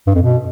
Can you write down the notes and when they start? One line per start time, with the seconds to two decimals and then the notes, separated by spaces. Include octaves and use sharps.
0.07 G2
0.15 F2
0.23 B2